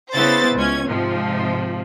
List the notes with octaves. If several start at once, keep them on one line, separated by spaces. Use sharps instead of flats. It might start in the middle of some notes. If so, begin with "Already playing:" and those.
C#3 B3 E4 C5 A6
C#2 C#4 G#6
G#2 C3 F3